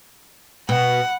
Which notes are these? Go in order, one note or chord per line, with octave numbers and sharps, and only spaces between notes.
B2 F#5